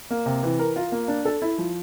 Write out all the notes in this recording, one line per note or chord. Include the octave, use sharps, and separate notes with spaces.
A#3
C3
E3
A#4
F4
A#3
D4
A4
E4
F3